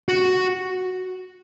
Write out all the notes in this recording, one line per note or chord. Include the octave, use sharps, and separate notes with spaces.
F#4